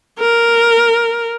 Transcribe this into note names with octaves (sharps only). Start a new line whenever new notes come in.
A#4